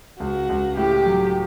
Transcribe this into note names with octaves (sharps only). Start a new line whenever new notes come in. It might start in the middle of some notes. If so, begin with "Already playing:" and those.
C#2 F#4
C#2
A2 G4
F#3